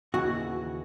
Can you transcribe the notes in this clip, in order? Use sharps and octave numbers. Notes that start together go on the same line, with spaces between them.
D#2 C#3 E3 F#4